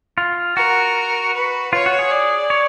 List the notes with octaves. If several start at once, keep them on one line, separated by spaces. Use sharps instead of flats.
F4
F#4 A#4
B4
F4 C#5
F#4
G#4
D5
C#5